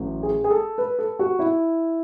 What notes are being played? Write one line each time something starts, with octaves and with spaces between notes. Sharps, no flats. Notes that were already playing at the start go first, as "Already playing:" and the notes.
Already playing: A1 A2 F#3
G#4
G#4
A4
B4
A4
F#4
E4